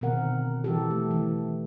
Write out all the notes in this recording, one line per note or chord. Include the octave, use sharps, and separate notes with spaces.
B2 D3 D#3 C4 A#4 F#5
E3 G4 A4
A3
E3